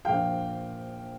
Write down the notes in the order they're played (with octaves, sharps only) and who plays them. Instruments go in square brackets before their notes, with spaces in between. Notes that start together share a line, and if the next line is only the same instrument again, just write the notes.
[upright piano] A#1 A#2 F3 F5 G5